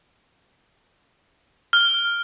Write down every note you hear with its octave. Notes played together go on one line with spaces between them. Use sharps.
F6